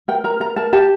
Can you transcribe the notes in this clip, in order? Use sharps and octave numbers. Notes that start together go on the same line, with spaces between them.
A#4 G5
A#4 A#5
A#4 A#5
A#4 A5
G4 A5